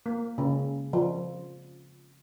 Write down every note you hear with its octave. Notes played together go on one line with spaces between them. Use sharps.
A#3
C#3
F3